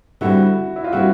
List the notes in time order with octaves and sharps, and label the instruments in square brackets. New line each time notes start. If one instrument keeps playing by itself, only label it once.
[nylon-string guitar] D3 G3 C4 [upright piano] E4 F#4
[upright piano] E4
F4
[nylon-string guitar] D3 G3 C4 [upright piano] E4 F#4